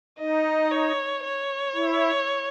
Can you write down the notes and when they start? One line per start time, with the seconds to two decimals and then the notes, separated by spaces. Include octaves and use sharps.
0.19 D#4 D#5
0.71 C#5
1.24 C#5
1.75 E4